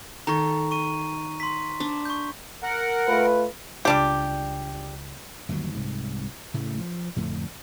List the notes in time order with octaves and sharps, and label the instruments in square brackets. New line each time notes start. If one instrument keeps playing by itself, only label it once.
[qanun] D#3 A4 [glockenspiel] A#5 C#6
[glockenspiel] C#6 D#7
C6 B6
[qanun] D4
[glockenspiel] C#6 G6
[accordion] A#4 F#5
[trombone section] A3 F4 B4
[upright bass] C#2 [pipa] G3 D4 G4
[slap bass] G1 D#2 B2 F#3
C2 G#2
A2 C#3 A3
F3
F2 A2 D3